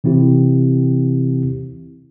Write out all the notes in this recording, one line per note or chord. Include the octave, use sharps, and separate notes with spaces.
C3 E3 C4 E4 G4